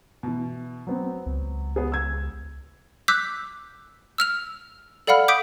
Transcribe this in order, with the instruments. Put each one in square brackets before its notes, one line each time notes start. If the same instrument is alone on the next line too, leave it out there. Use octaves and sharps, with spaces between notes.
[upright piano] B2 E3
F#3 B3 C4
[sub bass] C#2
[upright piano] B3 G#4
E6 G#6
[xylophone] D6 E6 F#6 G6 B6
E6 F6 F7
A4 D5 F5 F#5 B5 F6
D6 D#6 G6 B6 D7